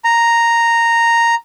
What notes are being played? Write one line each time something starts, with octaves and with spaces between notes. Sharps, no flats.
A#5